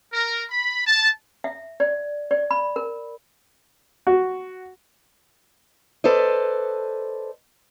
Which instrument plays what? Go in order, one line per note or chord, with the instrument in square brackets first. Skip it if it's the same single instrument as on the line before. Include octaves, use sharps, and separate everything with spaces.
[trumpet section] A#4
B5
A5
[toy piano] E5
D5
D5
B5
A#4
[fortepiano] F#4
[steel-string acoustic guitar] A4 B4 C5 D5 D#5